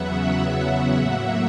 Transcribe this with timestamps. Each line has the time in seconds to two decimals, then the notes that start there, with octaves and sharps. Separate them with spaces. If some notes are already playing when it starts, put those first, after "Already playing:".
Already playing: E2 C#3 F#3 B3 E5 F#5
0.96 A2 F#3 A#3 E5 F#5